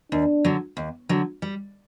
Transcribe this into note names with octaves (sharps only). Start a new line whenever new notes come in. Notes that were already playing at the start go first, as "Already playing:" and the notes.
D#2 D4
D3 F#3
D#2
D3 F#3
G3